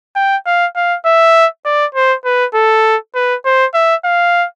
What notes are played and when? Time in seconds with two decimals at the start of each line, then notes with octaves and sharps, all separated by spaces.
0.16 G5
0.46 F5
0.76 F5
1.05 E5
1.65 D5
1.95 C5
2.25 B4
2.55 A4
3.15 B4
3.45 C5
3.74 E5
4.05 F5